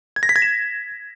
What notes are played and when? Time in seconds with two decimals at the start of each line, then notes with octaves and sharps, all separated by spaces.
0.16 G#6
0.23 A#6
0.29 B6
0.36 G#6
0.42 E7